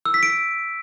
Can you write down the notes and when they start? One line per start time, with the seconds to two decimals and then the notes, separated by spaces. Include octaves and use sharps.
0.05 E6
0.14 B6
0.23 D7